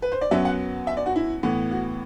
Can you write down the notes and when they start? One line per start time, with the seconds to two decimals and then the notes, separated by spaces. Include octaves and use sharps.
0.02 B4
0.12 C5
0.21 D5
0.31 F#2 F#3 B3 E5
0.45 F#5
0.87 E5
0.97 D5
1.06 F#4
1.16 E4
1.43 A2 E3 B3
1.71 F#4